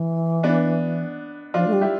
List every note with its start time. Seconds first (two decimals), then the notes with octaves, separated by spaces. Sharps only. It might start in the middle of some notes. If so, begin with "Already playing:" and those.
Already playing: E3
0.43 B3 D4
1.54 F3 D4 F4
1.67 A3
1.73 G3
1.81 E4 G4